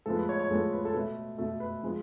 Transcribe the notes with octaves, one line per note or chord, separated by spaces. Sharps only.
A2 F3 G#3 B3 A4
B4
C#5
C#5
A2 F3 G#3 B3 A4
B4
A4
B2 A3 B4
B2 A3 A4
B4
F3 G#3 B3